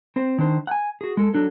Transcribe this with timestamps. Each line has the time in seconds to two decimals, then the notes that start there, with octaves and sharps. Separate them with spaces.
0.16 C4 C5
0.38 D#3 D4 C5
0.67 F#5 G#5
1.01 F#4 G#4
1.17 G#3 A4
1.34 F#3 D4 A4